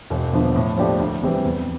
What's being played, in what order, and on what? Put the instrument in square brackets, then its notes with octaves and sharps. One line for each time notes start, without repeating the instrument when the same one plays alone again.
[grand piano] E1
E2 D3 F3 B3
A2
F3 A3 D4 G4
D2
C3 E3 G3 C4
E2